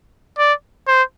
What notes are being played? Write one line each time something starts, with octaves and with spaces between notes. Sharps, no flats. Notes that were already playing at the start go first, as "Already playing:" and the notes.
D5
C5